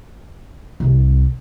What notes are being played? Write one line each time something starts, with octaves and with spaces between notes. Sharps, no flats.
C2